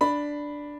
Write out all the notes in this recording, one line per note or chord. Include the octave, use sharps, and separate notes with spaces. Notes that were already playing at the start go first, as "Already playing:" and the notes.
D4 B5